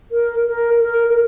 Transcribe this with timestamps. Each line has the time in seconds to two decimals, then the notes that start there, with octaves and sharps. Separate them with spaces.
0.12 A#4
0.46 A#4
0.80 A#4
1.10 A#4